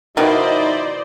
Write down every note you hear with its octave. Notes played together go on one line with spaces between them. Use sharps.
B2 D#3 F3 D#4 E4 C5 D5 D#5